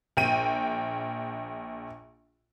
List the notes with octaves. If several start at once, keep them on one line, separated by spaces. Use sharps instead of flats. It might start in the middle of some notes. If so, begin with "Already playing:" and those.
A#1 G5 D#7